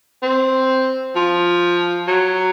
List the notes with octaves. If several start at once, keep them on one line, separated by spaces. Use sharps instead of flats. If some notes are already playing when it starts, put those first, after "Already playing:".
C4
F3
F#3